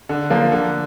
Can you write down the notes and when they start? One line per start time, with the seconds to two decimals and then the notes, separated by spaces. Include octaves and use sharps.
0.09 D3
0.30 F3 A#3
0.52 D3